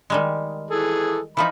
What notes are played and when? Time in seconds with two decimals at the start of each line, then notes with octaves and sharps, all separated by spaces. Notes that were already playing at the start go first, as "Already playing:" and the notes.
0.10 D#3 G3 G#3
0.71 E3 G#4 A4
1.37 E3 F3 D#4 B5